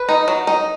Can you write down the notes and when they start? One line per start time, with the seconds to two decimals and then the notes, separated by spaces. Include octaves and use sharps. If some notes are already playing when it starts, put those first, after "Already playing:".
Already playing: B4
0.09 D#4
0.28 F#3
0.47 D#4